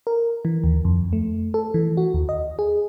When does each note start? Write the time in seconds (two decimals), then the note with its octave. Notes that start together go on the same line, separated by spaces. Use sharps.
0.07 A#4
0.45 E3
0.64 D#2
0.85 F2
1.13 A3
1.54 A4
1.74 E3
1.97 F#4
2.14 D#2
2.29 D#5
2.59 G#4